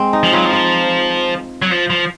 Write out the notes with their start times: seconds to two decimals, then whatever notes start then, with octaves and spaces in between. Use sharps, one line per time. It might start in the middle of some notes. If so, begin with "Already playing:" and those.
Already playing: G#3 C4
0.13 D#4
0.23 F3
0.32 F#3 F4
0.45 F3
0.53 F4
1.62 F#3
1.71 F3
1.90 F3